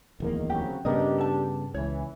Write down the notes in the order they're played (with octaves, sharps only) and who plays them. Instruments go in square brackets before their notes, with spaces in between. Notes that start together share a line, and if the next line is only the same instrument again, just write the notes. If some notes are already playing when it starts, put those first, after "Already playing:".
[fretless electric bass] D1 E2 A#3 [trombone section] D#3
[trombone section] C#3 F#3 C4 [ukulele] G4
[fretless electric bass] G2 C#3 B3 [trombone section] D4 G4 [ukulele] A#4 D#5
[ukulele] A4 A5
[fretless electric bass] C#2 [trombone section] E3 [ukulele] C#5